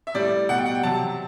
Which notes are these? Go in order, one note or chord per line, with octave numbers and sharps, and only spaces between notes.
E5
A2 G3 D5
B2 G3 F#5
G5
F#5
G5
C3 F#3 A5